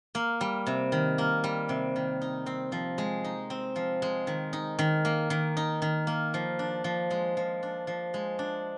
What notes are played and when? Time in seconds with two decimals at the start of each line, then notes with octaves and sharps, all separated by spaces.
0.15 A#3
0.41 G3
0.67 C3
0.92 D#3
1.18 A#3
1.44 G3
1.69 C3
1.96 D#3
2.21 D#4
2.46 C4
2.72 F3
2.98 G#3
3.24 D#4
3.50 C4
3.76 F3
4.02 G#3
4.27 D#3
4.53 D#4
4.79 D#3
5.05 A#3
5.30 D#3
5.57 D#4
5.82 D#3
6.07 A#3
6.34 F3
6.59 D4
6.84 F3
7.11 G#3
7.37 F3
7.63 D4
7.87 F3
8.14 G#3
8.39 D4